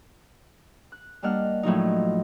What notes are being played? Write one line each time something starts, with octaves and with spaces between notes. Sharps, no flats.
F#6
G3 A#3 D4 D#5 F#5 F6
A2 F3 F#3 D#4